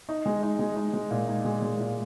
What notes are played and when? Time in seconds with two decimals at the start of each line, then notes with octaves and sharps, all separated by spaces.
0.09 D#4
0.26 G#3
0.43 D#4
0.59 G#3
0.76 D#4
0.93 G#3
1.11 A#2
1.28 D#4
1.45 G#3
1.62 G#3
1.79 A#2